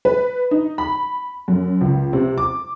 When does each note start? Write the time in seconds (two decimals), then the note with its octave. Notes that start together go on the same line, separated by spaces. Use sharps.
0.05 B4
0.51 D#4
0.78 B5
1.48 F#2
1.81 C#2
2.13 C3
2.38 D6